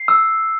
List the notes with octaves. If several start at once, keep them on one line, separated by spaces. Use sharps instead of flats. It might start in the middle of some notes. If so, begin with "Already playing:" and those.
Already playing: C7
E6